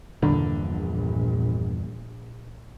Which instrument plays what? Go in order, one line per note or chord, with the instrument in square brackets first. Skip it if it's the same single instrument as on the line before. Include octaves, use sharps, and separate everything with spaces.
[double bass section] A#1 [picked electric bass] E2 G2 A#2 [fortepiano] D3